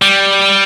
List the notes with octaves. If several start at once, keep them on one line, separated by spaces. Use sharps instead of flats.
G3